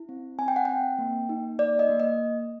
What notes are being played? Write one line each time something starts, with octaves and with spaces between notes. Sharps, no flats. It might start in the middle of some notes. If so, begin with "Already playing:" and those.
Already playing: E4
C4
C4 G#5
G5
F#5
C4 G5
A#3
D#4
A#3 D5
D#5
A#3
D#5